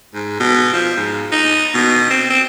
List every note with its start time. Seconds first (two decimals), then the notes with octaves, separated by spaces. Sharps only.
0.14 G#2
0.40 B2
0.73 F3
0.97 G#2
1.32 D#4
1.74 B2
2.10 C4
2.30 C4